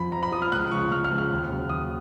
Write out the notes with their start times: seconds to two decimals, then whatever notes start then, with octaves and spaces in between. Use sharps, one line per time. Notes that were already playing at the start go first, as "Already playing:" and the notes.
Already playing: F2 F3 B5
0.12 F2 A#5
0.23 B5
0.32 F3 D#6
0.42 F6
0.52 C#2 F#6
0.71 C#3 F3 C#6
0.91 C#2 F6
1.04 F6
1.11 C#3 F3
1.18 F6
1.31 D#2
1.50 C#3 F#3
1.69 D#2 D#6